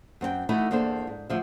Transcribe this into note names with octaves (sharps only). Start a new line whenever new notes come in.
F#2 C4 A4 G5
E3 A3 D#4 E4 F#4 A4
E2 A#3 D4 A4 C5
G#2
D2 F3 E5